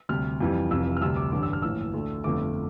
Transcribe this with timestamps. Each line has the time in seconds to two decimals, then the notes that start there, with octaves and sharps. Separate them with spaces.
0.09 D2 C3 G3 F6
0.40 F2 E3 G3
0.71 F1 F2 C3 E3 E6
0.97 F6
1.01 D2 C3 G3 E6
1.16 D6
1.32 A1 G2 D3 D6
1.42 E6
1.53 F6
1.62 A#1 A2 E3 E6
1.94 D2 D3 A3
2.24 G1 F2 D3 A3 D6